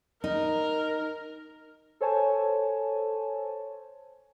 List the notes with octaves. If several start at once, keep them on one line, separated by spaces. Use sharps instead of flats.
D#4 A#4
A4 C5 C#5 G#5 A5